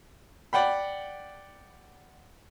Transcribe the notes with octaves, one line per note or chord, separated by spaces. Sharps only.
D5 F#5 G5 B5